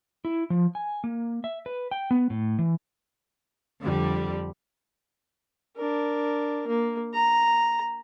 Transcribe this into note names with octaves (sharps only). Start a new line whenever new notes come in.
E4
F3
G#5
A#3
E5
B4
G5
B3
A2
E3
F2 D3 G3
D4 A#4
A#3
A#5